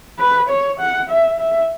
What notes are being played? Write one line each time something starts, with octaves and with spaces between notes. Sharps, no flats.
B4
C#5
F#5
E5
E5